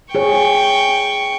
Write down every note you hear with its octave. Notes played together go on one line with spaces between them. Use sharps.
G#4 C#5 G5 C#6